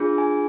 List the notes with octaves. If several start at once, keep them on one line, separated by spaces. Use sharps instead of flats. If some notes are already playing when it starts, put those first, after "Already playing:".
Already playing: D4 F4 G#4
G#5